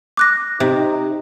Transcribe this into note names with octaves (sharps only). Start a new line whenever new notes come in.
D6 F#6 A#6
C3 D#4